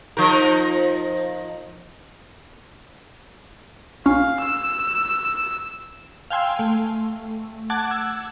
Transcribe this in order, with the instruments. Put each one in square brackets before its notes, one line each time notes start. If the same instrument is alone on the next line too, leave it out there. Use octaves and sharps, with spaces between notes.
[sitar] F3 D#4 A#4
[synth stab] A#1 C#4 [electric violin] F5
[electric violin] E6
[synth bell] F5 G5 G#5 C6 E6
A3
F#5 A5 D6 F#6 G#6
E6 G#6